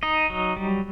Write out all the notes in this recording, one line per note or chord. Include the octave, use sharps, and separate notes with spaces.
D#4 D#5
F#3
G3